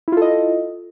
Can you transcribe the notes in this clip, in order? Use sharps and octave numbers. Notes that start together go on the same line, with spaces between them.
E4 F4 A4 D#5